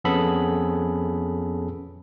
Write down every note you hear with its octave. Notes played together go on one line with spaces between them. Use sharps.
F2 B3 C#4 G#4 A4 B5